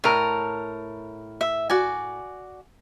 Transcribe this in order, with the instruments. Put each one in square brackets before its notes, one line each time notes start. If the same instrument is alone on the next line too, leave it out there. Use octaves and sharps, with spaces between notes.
[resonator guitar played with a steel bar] A2 A#4 [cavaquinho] C#5
[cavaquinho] E5
F#4 D5 G#5